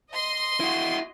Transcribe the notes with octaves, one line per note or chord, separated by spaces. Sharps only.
D#5 C6
E4 F#4